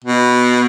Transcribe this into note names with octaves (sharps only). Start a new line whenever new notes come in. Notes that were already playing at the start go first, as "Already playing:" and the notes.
B2